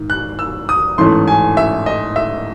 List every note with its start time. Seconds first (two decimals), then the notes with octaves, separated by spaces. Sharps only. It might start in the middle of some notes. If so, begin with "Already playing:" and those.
Already playing: G#2 D#3
0.10 F#6
0.39 E6
0.69 D#6
0.98 A1 G#2 E3 A3 C#4 C6
1.28 G#5
1.57 E5
1.86 D#5
2.16 E5